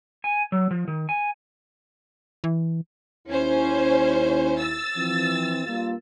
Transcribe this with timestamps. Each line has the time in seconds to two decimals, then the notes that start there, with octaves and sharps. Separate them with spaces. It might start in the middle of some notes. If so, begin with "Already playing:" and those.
0.24 G#5
0.52 F#3
0.71 F3
0.88 D#3
1.09 G#5
2.44 E3
3.28 D#2 C#4 E4 C5
4.60 E6 A6
4.97 E3 F3 C4
5.66 G2 A#3 F4